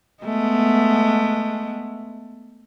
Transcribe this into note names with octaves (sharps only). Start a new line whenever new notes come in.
G#3 A3 B3